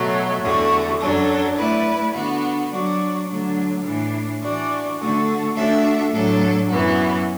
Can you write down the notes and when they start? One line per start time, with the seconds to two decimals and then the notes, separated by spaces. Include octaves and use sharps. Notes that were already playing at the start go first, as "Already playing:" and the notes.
Already playing: B2 F#3 A3 F#4
0.43 E2 D3 A3 F#4
1.00 F#2 F#3 D4 A4
1.57 A3 E4 B4 D5
2.14 D3 B3 D4 F#4
2.71 F#3 D4 F#4 D5
3.27 D3 F#3 A3 D4
3.84 A2 E3 D4
4.42 E3 D4 F#4 D5
4.99 D3 A3 F#4 A4
5.56 A3 D4 F#4 A4 E5
6.13 A2 F#3 D4 A4
6.69 F#2 E3 B3 F#4